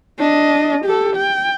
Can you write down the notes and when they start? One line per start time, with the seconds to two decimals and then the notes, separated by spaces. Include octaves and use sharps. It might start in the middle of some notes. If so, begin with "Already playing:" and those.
0.19 D4 D#5
0.85 G4 A4
1.16 G5